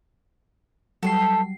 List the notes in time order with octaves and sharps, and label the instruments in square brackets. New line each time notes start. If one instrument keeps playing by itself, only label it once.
[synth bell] F#3 G3 C7 [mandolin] A4 C#6